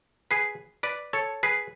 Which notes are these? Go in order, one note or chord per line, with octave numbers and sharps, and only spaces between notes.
G#4 B4
B4 D5
A4 C#5
G#4 B4